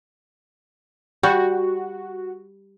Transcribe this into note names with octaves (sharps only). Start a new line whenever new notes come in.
G3 F#4